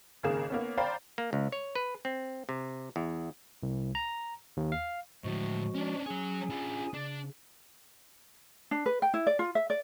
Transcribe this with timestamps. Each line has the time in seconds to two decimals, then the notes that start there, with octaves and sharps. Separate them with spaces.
0.23 G#1 C#3 A#3 G#4 A#4 E7
0.50 A#3 B3 C#4
0.77 C5 D5 F5 G5 A#5 B5
1.18 A#3
1.33 C#2
1.52 C#5
1.75 B4
2.05 C4
2.49 C3
2.96 E2
3.63 C2
3.95 A#5
4.57 D#2
4.72 F5
5.24 A2 D3 F3 G#3 F#4
5.75 C#4 D4
6.06 F#3 C#4 G#4 C#5 G#5
6.50 D4 F4
6.94 C#3 D4
8.71 D4
8.86 B4
9.02 G5
9.14 E4
9.27 D5
9.39 F4
9.55 E5
9.70 D5